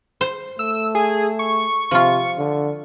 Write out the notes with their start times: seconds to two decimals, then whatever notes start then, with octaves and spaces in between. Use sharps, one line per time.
0.21 C5
0.59 A3 E6
0.95 G#4
1.39 C#6
1.91 C3 F3 F4
2.38 D3